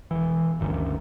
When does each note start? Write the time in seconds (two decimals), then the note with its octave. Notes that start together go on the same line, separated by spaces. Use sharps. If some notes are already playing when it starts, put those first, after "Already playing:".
0.11 E1 E3
0.60 G1 D2 D#3 C#4